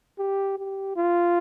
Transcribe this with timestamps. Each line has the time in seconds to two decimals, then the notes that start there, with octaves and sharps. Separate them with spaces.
0.19 G4
0.58 G4
0.97 F4